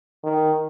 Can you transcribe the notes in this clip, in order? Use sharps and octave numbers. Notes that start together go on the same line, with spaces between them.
D#3